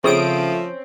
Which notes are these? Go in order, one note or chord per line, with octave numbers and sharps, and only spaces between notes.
C#3 F3 A3 C4 C#4 D#6 D7